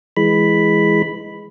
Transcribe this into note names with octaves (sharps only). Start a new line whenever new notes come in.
E3 G#3 B5